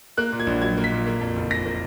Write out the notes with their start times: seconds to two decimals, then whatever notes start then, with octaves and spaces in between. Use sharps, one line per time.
0.17 A#3 F#6
0.32 A#2
0.40 G#6
0.47 A#1
0.62 F#3 G#6
0.77 A#3
0.84 B6
0.91 A#2
1.07 A#3
1.21 F2
1.36 F#1
1.51 F3 A#6
1.65 A#3